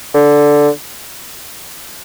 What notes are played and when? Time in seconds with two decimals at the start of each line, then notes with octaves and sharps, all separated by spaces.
0.14 D3